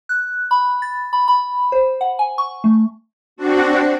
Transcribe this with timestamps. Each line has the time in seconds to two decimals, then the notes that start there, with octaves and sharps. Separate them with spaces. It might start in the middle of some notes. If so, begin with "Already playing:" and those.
0.09 F#6
0.51 B5
0.82 A6
1.13 B5
1.28 B5
1.72 C5
2.01 F#5
2.19 G#5
2.38 C#6
2.64 A3
3.36 C4 D4 F#4